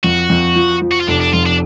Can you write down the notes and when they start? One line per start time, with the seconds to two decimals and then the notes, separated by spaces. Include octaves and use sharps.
0.03 F2 F#4
0.30 F2
0.56 F3
0.82 F3
0.92 F#4
1.01 F4
1.08 F1 D4
1.21 D4
1.33 F2 F4
1.46 D4